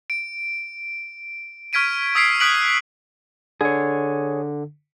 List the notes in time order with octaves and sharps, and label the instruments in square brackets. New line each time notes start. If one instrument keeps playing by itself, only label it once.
[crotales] D7
C#6 F6 G#6 B6 D7 D#7
D#6 E6 G#6 B6 C7 D7
D#6 F#6 B6 D7 F#7
[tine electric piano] D3 [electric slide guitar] G#4 C#5